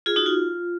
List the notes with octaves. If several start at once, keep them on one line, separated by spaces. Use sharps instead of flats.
F4 G#4
D#4 F#4
F4